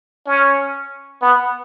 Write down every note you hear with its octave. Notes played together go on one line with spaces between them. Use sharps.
C#4
B3